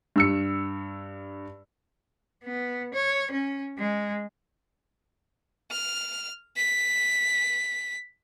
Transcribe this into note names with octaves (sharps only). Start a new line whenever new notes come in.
G2 E6 C#7
B3
C#5
C#4
G#3
F6
B6